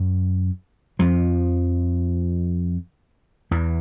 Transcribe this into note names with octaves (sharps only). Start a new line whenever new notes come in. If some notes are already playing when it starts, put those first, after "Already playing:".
Already playing: F#2 F#3
F2 F3
E2 E3